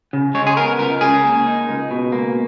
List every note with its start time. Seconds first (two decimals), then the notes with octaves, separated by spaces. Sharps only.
0.13 C#3
0.34 G#3 C#5
0.47 G#4
0.57 B3 A#4
0.79 C#2 A#4
1.01 C#3 G#4
1.23 A#3
1.47 D#4
1.69 C#2
1.91 B2
2.12 A#3